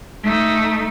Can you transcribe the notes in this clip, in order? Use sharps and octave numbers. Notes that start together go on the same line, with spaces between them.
A3 D#4